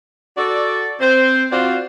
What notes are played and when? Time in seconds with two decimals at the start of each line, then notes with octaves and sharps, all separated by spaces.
0.38 F#4 A4 D5
1.01 C4 C5
1.52 C4 F4 F#4 C5 D5